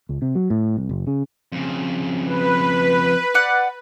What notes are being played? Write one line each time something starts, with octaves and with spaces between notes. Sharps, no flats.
C#2
C3
F#3
A2
C2
F#1
C#3
F2 C#3
B4
D5 F#5